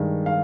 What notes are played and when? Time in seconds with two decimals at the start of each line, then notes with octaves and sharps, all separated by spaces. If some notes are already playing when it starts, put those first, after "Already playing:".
Already playing: G2 D#3 G#3
0.26 F5